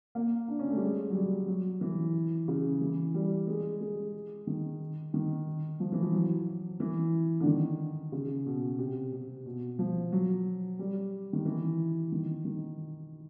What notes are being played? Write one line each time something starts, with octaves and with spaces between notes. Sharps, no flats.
A#3
D4
C#4
A3
G3
G#3
F#3
G3
F#3
E3
C#3
E3
G3
G#3
G#3
D#3
D#3
F3
E3
F3
F#3
E3
D3
D#3
C#3
B2
C3
C3
B2
F3
F#3
G3
D#3
E3
D#3
D#3